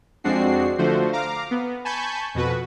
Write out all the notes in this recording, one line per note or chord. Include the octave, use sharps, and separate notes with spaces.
F2 G#3 C4 D4 F#4 C7
D3 F3 A3 F#4 C5
F5 A#5 D6
B3
G#5 A5 B5 C#6 G6
F2 B2 F#4 B4